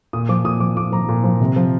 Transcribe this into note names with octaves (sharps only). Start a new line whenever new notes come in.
A#2 D#6
F3 D6
A#2 D#6
F3 D6
A#2 D6
F3 A#5
A#2
F3
C3
F3